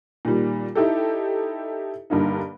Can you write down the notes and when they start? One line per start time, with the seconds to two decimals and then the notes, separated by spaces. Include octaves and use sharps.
0.25 A#2 D#3 G3
0.75 D#4 E4 G4 A4
2.10 G2 D3 A#3 D#4